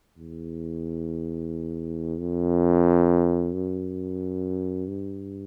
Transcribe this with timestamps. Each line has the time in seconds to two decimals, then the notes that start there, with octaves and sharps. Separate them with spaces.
0.17 E2
2.19 F2
3.53 F#2
4.88 G2